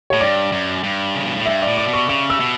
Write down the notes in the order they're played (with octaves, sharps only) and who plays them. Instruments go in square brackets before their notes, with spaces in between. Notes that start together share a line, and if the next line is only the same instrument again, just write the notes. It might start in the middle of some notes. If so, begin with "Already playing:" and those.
[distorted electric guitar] A2 [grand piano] C#5
[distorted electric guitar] G2 [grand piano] D5
[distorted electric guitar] F#2
G2
C#3
B2
A2
[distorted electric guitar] G2 [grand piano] E5
[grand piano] D5
[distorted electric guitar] A2
[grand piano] D5
[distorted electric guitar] B2
[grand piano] C#6
[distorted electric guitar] C#3 [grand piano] C#6
[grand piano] E6
[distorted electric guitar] B2